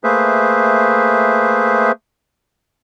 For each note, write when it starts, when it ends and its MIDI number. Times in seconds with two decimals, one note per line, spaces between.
0.04 1.92 57
0.04 1.92 58
0.04 1.92 68
0.04 1.92 71
0.04 1.92 72
0.04 1.92 76